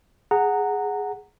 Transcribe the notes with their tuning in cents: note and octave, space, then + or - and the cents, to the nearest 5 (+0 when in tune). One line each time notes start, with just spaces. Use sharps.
G#4 +0 F#5 +0 A#5 -20